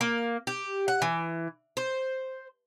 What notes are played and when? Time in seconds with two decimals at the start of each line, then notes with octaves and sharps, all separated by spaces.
0.01 A#3
0.47 G4
0.88 F#5
1.02 E3
1.77 C5